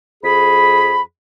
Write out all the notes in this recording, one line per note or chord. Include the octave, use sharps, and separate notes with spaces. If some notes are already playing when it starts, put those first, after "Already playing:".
F2 G#4 B5